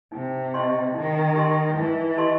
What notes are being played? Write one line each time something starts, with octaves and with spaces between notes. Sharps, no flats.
C3 D#4
G4 D#5 A5 C6
D#3 D#4
G4 D#5 A5 C6
E3 D#4
G4 D#5 A5 C6